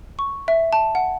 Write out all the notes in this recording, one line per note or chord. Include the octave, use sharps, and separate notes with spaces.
C#6
E5
A5
F#5